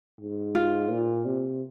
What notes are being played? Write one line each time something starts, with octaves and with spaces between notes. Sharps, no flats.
G#2
F4
A#2
C3